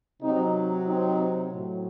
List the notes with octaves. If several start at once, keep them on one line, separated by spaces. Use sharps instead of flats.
C3 F#3 C4 D#4
C4 D#4
A2 F#3